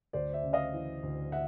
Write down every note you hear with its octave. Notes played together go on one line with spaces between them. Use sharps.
D2 C5 D5
D5 E5
C#3
D#5 F5
E3
D2
E5 F#5